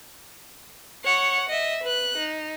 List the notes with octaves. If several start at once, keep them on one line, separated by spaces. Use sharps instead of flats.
C#5 F#5
D#5 E5
B4 F#6
D#4